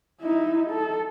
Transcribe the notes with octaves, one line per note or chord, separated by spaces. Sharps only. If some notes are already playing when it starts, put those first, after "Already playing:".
D#4 E4
A4